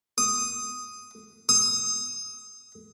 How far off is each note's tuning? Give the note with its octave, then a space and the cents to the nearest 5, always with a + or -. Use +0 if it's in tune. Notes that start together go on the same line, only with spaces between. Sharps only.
D#6 +0
D#6 +25